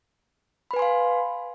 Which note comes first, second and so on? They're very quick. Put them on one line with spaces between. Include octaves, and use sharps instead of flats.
B5 B4 G#5 C6 F5